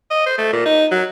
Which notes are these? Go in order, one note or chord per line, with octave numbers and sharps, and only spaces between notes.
D#5
C5
A3
A#2
D#4
F#3